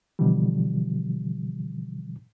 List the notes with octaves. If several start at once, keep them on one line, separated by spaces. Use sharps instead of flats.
B2 D3 E3 F3 G3